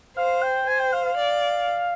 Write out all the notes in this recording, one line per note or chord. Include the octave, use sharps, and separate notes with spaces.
C5 F5
G5
C5 G#5
G5
F5
F5
D5